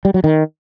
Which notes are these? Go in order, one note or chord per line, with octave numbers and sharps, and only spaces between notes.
G3
F#3
D#3